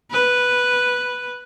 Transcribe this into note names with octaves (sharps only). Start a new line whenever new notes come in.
B4